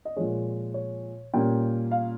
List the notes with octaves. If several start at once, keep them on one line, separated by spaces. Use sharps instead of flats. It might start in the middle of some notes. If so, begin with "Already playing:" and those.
D#5
A#2 F3 G#3 C#5
C#5
A#2 G3 A#3 C#4 G5
F5